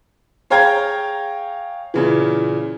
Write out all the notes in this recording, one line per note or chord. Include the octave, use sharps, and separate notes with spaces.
G#4 C#5 F5 G5 A#5 G#6
A#2 C#3 E3